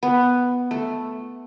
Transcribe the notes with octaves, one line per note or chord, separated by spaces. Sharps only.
B3
A3